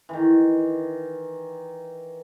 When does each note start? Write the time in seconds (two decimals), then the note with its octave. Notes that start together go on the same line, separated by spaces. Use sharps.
0.09 D#3 E3